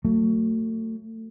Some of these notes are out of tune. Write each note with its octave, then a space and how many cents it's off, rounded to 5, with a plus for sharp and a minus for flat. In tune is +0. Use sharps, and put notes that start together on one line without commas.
F#3 -10 A3 +25